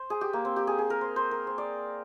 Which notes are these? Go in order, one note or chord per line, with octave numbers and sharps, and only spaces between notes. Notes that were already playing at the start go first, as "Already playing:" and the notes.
Already playing: C5
G#4
G4
A#3
C4
G4
G#4
G#4
A#4
C5
C5
A#4
C5
D5